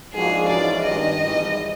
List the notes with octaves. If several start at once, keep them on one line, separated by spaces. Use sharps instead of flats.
G#2 F3 A#3 D4 F#4 G#4
G#2 E3 G#3 C#4 F#4 D5
G#1 G2 D#3 D#5
G#1 G#2 E3 G3